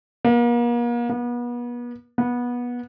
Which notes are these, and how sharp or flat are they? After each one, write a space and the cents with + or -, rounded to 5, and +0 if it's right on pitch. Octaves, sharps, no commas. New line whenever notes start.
A#3 +40
B3 -35
B3 -20